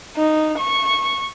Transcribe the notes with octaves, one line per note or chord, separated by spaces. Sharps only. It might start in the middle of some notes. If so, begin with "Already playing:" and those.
D#4
C#6